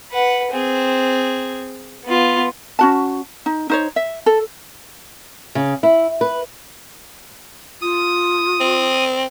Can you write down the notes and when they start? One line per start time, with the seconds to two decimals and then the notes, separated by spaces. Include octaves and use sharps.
0.11 B4 F#5
0.51 C4 G#4
2.05 B3 F4
2.79 C#4 F#4 A5
3.46 D#4
3.70 D#4 C5 C#5
3.96 E5
4.26 A4
5.55 C#3
5.83 E4
6.21 B4
7.81 F4 D#6
8.60 C4